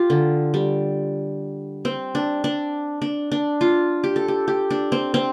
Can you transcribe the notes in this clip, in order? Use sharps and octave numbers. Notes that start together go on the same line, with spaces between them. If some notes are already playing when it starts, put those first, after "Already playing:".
Already playing: F4 G4
D3
G3
C4
D4
D4
D4
D4
F4
G4
A4
G4
G4
D4
C4
C4